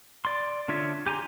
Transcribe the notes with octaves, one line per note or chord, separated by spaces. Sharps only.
D5 C6
D3 D4 F4 C#5 E5
G4 G#5 A#5 C6